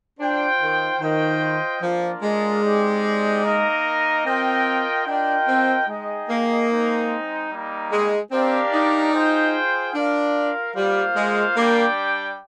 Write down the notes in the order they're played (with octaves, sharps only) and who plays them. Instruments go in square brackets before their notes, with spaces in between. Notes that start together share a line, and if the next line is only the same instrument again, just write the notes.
[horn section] D4 [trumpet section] F4 C5 G5
[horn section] D#3
[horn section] D#3 [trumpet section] F4 C5 D#5 G5
[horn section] F3 [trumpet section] A#3 D4 F4 A#4 D5
[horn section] G#3
[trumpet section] C4 D#4 G4 D5
A#3 D#4 A#4 D#5
[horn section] C4 [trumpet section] F4 A#4 D#5 G5
[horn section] D4 [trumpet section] F4 A#4 D#5 G5
[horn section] C4
[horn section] G#3 [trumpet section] D#4 G#4 D#5 G5
[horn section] A#3
[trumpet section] G#3 C4 D#4
G3 A#3 D#4
[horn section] G#3
[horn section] C4 [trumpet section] D4 G4 A#4 D5 F5
[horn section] D#4
[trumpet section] F4 G#4 C5 G5
[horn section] D4 [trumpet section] F4 A#4 F5
[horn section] G3 [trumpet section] A#3 F4 C5 F5
[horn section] G#3
[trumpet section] G3 D4 G4 D5 G5 [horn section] A#3